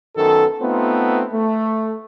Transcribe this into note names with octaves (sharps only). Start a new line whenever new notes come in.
F#2 D#3 B3 A4
A3 B3 C4 D#4 F4
A3